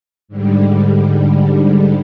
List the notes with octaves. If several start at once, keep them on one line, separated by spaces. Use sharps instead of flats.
G#2 D3 G3